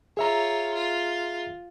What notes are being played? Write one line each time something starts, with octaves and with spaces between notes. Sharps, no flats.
F4 G#4 C#5 E5 A#5
F4